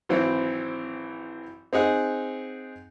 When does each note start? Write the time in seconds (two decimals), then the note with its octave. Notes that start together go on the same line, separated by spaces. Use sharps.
0.09 G#1 E3 F#3 C4
1.73 C4 D#4 G#4 F#5